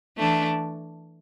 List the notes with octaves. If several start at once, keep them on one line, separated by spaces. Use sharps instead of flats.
E3 A3 D4